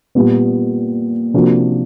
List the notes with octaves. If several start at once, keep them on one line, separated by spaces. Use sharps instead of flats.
A#2 G3 B3
C3 F3 A#3 D4 F#4